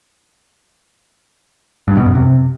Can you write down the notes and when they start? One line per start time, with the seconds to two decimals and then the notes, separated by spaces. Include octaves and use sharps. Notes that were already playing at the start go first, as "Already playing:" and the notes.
1.88 G2
1.97 B2
2.06 F#2
2.15 C3